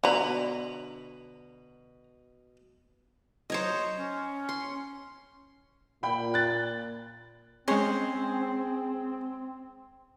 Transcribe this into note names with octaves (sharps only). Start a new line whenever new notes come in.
B2 D3 A#5 B5
F#3 C5 C#5 D#5
C#4
C6
A#2 G5 B5
F#6 A6
G#3 C4 C#4 G#4 C5